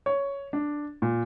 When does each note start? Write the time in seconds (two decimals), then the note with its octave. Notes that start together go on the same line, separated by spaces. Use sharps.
0.06 C#5
0.53 D4
1.02 A#2